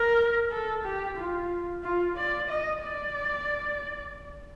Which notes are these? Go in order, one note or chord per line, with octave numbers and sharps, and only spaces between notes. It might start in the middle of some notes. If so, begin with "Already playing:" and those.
Already playing: A#4
A4
G4
F4
F4
D5
D#5
D5